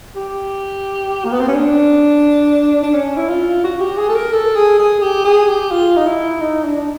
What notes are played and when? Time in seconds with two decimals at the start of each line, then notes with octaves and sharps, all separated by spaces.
0.16 G4
1.25 A#3
1.33 B3
1.40 C4
1.48 C#4
1.54 D4
2.83 D4
2.93 C#4
3.17 E4
3.28 F4
3.64 F#4
3.80 G4
3.97 G#4
4.09 A4
4.15 A#4
4.33 A4
4.56 G#4
4.78 G#4
5.01 G4
5.25 G#4
5.48 G4
5.71 F4
5.96 D#4
6.07 E4
6.41 D#4
6.64 D4
6.76 D4